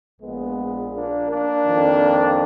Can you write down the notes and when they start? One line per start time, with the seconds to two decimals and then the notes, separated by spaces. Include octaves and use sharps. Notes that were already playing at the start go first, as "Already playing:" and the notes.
0.21 A#1 A#2 G#3 B3
0.93 A#3 D4
1.29 A#3 D4
1.65 F2 D#3